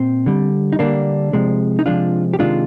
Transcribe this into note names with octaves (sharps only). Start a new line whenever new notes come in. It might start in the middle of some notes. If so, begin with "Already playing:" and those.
Already playing: A#2 C4
D3 G3
D#4
D3 G3 A#3 D4
C3 F3 G#3
D#4
C3 F3 G#3 D4 F4
G4
C3 D#3 G#3 D4 F4